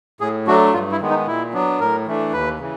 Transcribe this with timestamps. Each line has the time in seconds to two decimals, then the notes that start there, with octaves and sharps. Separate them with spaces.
0.21 A2 G#4
0.47 F#3 A3 D4 F#4
0.73 G2 F4
0.92 E4
1.00 D#3 G#3 B3
1.09 D#4
1.27 A#2 E4
1.53 F#3 B3 D4
1.80 A2 A#4
2.07 E3 A3 D4
2.33 D#2 B4
2.59 C#3 E3